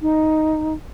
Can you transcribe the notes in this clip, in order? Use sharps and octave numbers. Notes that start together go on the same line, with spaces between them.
D#4